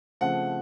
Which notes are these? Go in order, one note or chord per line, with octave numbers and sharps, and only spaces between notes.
C#3 F3 A3 C4 F#5